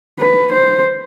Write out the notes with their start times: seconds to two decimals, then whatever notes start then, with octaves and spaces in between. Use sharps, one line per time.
0.19 B4
0.52 C5